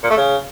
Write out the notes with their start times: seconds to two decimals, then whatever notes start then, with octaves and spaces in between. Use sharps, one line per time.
0.04 A#2
0.11 A3
0.18 C#3